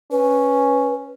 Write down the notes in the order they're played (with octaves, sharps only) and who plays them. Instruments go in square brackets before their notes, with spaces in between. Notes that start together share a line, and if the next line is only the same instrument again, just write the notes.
[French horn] C#4 [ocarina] B4